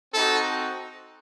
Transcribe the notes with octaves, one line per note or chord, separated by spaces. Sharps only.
C4 D#4 F#4 A4